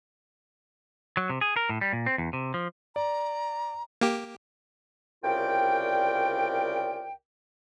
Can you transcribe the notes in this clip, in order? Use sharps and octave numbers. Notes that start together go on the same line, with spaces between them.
F#3
C3
G#4
A#4
A2
G3
A#2
C4
E2
C3
F3
D5 A#5
A#3 G4
C2 C#3 F4 A#4 D5 G5